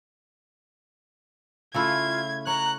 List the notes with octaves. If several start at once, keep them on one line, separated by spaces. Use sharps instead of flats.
C#3 A3 E4 F4 G#6
C#5 A#5 F#6